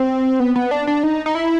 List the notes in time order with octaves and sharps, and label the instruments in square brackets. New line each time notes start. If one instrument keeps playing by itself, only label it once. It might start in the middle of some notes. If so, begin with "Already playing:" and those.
Already playing: [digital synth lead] C4
B3
B3
D4
D4
D#4
D#4
E4